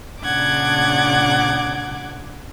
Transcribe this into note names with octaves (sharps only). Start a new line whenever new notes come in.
A#2 C#3 D4 F#5 D6 G#6